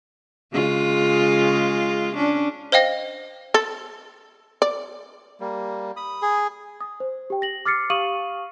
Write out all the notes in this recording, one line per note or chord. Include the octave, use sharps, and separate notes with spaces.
C#3 G#3 F4
C#4 D4
C5 D#5 F5 G5 A#6
A4
D5
G3 A#3
B5 D#6
G#4
D#6
C5
G4 G5
A#6 F#7
D6 F6 A6 C7 C#7
G4 F5 C#6 D#6 D#7 F#7